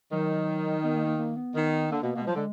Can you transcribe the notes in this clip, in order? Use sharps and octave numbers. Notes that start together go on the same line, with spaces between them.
D#3 F#3
B3
A#3
A#3
A#3
B3
D#3
D3 A#3
B2 A#3
B2 A#3
G#3
F3
F#3
D3 G#3